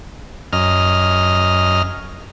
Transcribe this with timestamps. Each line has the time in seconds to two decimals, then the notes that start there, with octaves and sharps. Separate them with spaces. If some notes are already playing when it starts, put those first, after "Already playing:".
0.53 F#2 D#5 F6